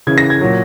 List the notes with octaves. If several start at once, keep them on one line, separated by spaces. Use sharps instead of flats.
C#3 E3 G#6
A#6
G#6
A#2 F#3